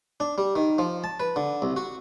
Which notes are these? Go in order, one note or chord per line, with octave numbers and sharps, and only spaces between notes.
D4
G3
D#3
F3
A5
B4
D3
C2
F#4